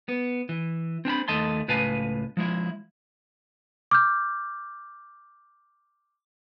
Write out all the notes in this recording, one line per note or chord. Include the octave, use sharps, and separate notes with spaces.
B3
E3
C4 D4 G#5 B5
D#2 A3 D#5 A5 C6
C#2 A2 B4 F5 G#5 A5
F3 G#3 E4
D6 F6 G6